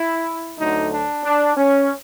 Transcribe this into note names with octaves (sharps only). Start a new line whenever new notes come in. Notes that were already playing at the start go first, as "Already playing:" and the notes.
Already playing: E4
D2 D3 F#3 A3 D#4
D4
D4
C#4